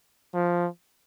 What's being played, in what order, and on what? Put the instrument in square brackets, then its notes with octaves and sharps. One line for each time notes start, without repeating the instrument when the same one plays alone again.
[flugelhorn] F3